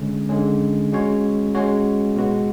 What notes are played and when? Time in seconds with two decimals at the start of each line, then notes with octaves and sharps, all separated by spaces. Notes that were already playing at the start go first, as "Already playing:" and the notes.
Already playing: D3 G#3 C#4
0.29 D3 G#3 C#4
0.92 G#3 C#4 F#4 C#5
1.55 G#3 C#4 F#4 C#5
2.17 B2 G#3 B3 F#4